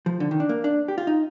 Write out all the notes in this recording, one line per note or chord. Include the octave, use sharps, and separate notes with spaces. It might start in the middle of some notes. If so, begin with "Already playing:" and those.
F3
D3
D#3
D4
A#3
D4
G4
F4
D#4